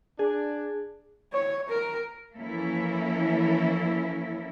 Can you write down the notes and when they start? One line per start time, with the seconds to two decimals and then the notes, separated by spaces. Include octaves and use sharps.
0.19 D4 G#4
1.33 C#5
1.69 A#4
2.37 E3 F3 A#3 C#4 E4 A4